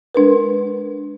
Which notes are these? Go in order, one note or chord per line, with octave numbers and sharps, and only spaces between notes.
G#3 D4 A#4 B4